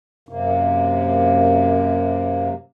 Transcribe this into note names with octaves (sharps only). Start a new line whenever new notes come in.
F#2 C3 A#3